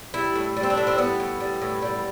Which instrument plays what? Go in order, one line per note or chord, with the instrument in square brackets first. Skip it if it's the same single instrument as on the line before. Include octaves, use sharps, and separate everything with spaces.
[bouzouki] G3 E4
A2
G3
C4
D4
A2
C4
G3 B3
A2
G3
A2
G3